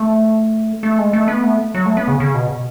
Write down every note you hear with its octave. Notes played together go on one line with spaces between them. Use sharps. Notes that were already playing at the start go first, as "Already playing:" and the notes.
Already playing: A3
A3
G#3
A3
B3
A3
F#3
A3
B3
C#3
C#3
B2